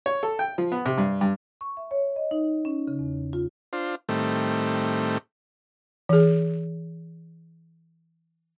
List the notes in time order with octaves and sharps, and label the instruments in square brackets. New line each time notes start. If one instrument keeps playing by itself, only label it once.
[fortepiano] C#5
A4
G5
F3
B3
C3
G2
G2
[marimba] C#6
E5
C#5
D#5
D#4
C#4
C#3
E2
F4
[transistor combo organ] D4 F4 C5
A2 D#3 G3 A3 C4
[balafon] E3 G#4